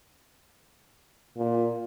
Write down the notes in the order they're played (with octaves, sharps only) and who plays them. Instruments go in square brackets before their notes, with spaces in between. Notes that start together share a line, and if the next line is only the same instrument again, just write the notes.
[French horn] A#2